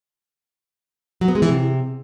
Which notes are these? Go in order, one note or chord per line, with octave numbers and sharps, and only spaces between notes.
F#3
B3
G#3
E3
C3